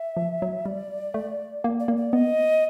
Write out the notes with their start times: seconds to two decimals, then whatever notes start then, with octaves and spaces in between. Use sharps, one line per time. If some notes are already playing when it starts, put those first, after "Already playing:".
Already playing: E5
0.17 F3
0.42 F#3
0.65 G3 D5
1.14 A3
1.64 A#3
1.80 D5
1.88 A#3
1.96 D5
2.13 B3 D#5